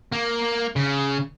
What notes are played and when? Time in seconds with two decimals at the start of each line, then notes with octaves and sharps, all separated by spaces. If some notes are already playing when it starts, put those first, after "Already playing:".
0.13 A#3
0.76 C#3